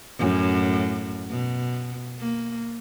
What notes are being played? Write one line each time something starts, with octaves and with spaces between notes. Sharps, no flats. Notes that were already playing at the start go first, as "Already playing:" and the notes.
F#2 A2
B2
A#3